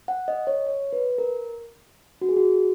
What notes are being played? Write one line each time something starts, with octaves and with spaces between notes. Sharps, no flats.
F#5
D#5
C#5
C#5
B4
A#4
F#4
G#4
F#4